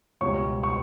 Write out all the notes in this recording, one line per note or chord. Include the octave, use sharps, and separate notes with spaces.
C#2 B2 G3 C#5 C#6
C#6